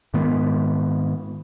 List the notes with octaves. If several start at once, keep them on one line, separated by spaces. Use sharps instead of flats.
G#2 D#3 G#3 B3